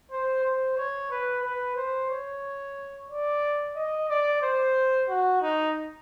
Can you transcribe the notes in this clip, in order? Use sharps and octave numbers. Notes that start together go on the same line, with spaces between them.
C5
C5
C#5
B4
B4
C5
C#5
D5
D#5
D5
C5
F#4
D#4